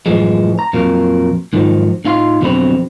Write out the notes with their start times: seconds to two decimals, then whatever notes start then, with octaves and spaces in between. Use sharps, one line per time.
0.06 F#2 A2 E3 F3 G#3
0.59 A#5
0.73 F2 A#2 F#3 F4 A#4
1.53 G#2 D#3 F3 F#3
2.05 A2 D#4 F4 F5 C6
2.41 F2 B2 D3 F#3 C4 B5